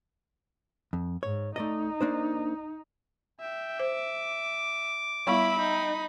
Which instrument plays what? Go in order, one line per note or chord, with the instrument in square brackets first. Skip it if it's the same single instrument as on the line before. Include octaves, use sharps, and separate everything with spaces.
[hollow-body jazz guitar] F2
[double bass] G#2 [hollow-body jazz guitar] C#5
[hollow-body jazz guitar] A3 D5 D#5 [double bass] D#4
[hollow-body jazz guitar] A#3 D4 C5
[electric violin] E5 [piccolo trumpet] G5
[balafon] C5 [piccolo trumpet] D6
[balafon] G3 B3 C#6 [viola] E4 E5 [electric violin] B5
[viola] D#4 [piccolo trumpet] G5